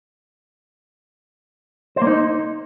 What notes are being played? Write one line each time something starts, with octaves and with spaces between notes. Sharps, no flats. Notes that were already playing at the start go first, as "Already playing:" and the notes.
C5
A#3
D#4